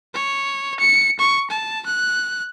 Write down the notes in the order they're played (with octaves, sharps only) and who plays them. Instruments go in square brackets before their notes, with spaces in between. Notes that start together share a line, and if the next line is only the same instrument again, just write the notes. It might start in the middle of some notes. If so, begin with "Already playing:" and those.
[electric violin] C#5
C#7
C#6
A5
F#6